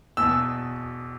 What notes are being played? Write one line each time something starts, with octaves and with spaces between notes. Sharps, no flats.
E2 B2 E6